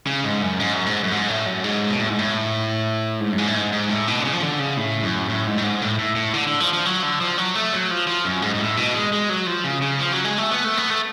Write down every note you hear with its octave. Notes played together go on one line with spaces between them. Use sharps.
C#3
G#2
F#2
G#2
F#2
G#2
F#2
G#2
A2
F#2
G#2
B2
A2
G#2
A2
G#2
F#2
G#2
A2
G#2
G#2
A2
B2
D3
C#3
F3
D3
C#3
A2
F#2
A2
G#2
A2
G#2
A2
A2
A2
D3
D3
F3
F3
F#3
D3
F3
F#3
A3
F#3
F3
F3
F#2
G#2
G#2
A2
B2
G#3
G#3
F#3
F3
C#3
C#3
F3
F#3
G#3
A3
B3
A3
B3
A3